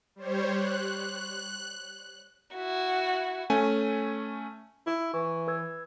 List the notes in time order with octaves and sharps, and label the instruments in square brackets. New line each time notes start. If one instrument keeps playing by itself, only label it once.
[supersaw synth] G3 C5 C#5
F#6
[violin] E4 F#4
[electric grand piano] A3 C#4 G#5
[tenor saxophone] E4
[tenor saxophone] E3 [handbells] C#6
[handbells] B4 E6 G#6